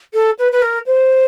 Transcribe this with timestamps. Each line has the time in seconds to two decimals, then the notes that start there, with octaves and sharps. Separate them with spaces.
0.13 A4
0.38 B4
0.52 B4
0.61 A#4
0.86 C5